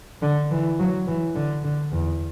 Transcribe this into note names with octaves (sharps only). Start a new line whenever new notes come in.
D3
E3
F#3
E3
D3
D3
E2